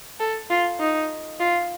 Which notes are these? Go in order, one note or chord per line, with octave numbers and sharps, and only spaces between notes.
A4
F4
D#4
F4